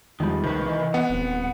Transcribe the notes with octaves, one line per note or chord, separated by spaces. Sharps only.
E2 D#3 F3 G3 G#3
C#2 C3 D#3 B4
E3 D#5
B3 F#5
D#1 C4